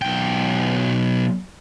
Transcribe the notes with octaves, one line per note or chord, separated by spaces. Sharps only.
B1 G5